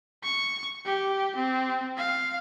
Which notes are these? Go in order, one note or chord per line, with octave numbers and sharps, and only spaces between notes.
C#6
G4
C4
F5